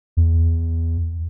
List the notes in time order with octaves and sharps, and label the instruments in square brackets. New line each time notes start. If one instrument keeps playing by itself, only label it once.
[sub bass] E2